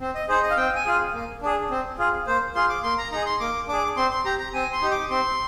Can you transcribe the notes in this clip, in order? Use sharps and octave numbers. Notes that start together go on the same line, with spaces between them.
C4
D#5
D#4 G#4 C5
D#5
F5
C4 G5
G#5
F4 G#4
A#3
D4 G#4
C4
F4 G#4
A#3 C5
F4 G#4 C6
D6
A#3 C6
A#5
D#4 G#4 A#5
C6
A#3 D6
D4 G#4 D6
C4 C6
C6
G4 A#5
A#5
C4 G#5
C6
D#4 G4
D6
C4 C6